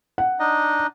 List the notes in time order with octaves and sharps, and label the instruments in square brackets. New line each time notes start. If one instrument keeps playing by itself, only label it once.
[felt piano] F#5
[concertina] D4 D#4 D#5